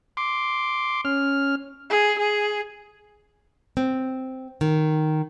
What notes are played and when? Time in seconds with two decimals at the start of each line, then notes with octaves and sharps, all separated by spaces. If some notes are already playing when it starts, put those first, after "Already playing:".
0.17 C6 D6
1.05 C#4 F6
1.90 G#4
2.19 G#4
3.77 C4
4.61 D#3